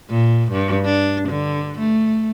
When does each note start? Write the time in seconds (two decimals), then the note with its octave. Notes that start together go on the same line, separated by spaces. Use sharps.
0.10 A#2
0.52 G2
0.85 D4
1.29 D3
1.79 A3